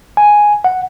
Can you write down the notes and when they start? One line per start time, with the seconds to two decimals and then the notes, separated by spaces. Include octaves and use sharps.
0.17 G#5
0.64 F#5